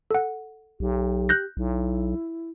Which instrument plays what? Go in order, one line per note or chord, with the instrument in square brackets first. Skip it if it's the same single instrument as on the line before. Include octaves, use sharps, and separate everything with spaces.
[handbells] A4 F#5
[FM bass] B1 [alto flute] G4
[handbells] F#6 G6 A#6
[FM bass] B1 [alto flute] E4